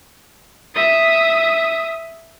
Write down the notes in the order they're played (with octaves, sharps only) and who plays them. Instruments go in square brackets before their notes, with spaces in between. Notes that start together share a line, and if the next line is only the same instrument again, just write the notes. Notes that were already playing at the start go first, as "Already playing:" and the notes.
[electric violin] E5 D#6